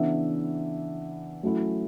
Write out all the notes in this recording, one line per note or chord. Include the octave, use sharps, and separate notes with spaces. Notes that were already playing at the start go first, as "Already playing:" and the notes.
Already playing: C#3 E3 B3 D4 E5
F#3 A3 C#4 E4